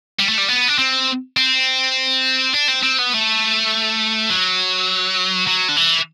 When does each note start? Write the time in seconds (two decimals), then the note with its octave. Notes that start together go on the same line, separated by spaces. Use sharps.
0.20 G3
0.29 A3
0.38 G3
0.49 B3
0.68 D4
0.78 C4
1.37 C4
2.54 D4
2.68 C4
2.83 C4
2.98 B3
3.13 A3
4.30 F#3
5.47 F#3
5.68 D3
5.76 E3